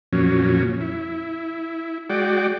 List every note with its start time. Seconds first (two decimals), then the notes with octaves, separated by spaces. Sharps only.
0.13 F2 A#2 F#3 C#4
0.81 E4
2.10 G#3 F#4 D5 G5